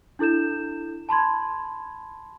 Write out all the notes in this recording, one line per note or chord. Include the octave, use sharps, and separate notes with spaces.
D4 E4 A4 G6 E7
A5 B5 C6 G#6